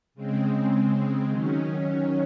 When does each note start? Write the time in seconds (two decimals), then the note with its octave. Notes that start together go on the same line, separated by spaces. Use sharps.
0.14 C#3 G#3 C4
1.28 D#3 F#3 C#4